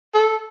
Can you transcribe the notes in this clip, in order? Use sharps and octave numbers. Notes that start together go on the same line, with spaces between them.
A4